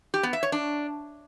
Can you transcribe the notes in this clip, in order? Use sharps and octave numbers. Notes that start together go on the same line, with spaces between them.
G4
B3
E5
C#5
D4